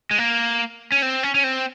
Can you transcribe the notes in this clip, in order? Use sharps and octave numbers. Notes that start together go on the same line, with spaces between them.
G#3
A#3
C#4
C4
C#4
C#4
C4